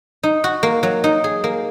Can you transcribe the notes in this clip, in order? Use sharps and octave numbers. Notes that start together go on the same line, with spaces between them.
D#4
F#4
A#3
F#3
D#4
G#4
A#3